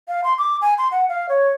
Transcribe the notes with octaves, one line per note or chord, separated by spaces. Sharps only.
F5
C6
D6
G#5
C6
F#5
F5
C#5